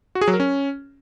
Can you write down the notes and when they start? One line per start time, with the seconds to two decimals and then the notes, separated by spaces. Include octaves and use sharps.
0.15 F#4
0.21 G#4
0.28 F#3
0.34 A#4
0.40 C#4